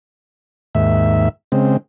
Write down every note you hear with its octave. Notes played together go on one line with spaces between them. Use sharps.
D#2 G#2 E5
C#3 G#3 C4